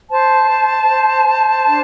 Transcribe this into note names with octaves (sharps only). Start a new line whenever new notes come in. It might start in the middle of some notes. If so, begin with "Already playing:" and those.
C5 A5
C5
C5
C5
D4